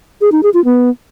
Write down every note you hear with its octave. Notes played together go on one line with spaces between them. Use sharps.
G#4
D#4
G#4
F4
B3